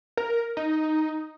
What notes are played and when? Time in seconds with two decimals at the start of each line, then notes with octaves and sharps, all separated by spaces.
0.17 A#4
0.57 D#4